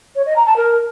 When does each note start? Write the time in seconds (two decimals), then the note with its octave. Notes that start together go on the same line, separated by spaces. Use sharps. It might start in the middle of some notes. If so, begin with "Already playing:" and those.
0.16 C#5
0.26 D#5
0.36 A#5
0.46 A5
0.56 A#4